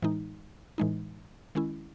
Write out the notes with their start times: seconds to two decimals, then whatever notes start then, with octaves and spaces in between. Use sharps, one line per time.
0.03 A2 E3 G#3 D#4
0.78 A2 E3 G#3 D#4
1.55 D#3 G#3 C#4 E4